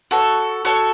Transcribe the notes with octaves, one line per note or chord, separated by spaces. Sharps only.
F#4 A4 C#5
F#4 A4 C#5